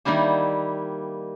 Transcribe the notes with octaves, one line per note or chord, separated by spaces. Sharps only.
D#3 G3 A#3 E4 G4